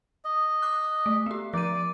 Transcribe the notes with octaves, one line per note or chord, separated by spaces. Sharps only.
D#5
D6 F#6
A3
B3 G4
F3 D5 D#7